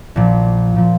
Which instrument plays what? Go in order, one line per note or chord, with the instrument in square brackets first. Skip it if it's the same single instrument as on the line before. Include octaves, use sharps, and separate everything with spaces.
[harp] A#1 A#2 F3
A#2 F3